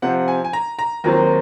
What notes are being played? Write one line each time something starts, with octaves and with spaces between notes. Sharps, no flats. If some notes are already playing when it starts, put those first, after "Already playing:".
C3 F3 C4 F#5
G#5
G#5
A#5
A#5
D#2 D#3 F#3 C4 A#5